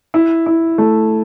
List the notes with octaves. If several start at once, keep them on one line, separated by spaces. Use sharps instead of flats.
E4
E4
A3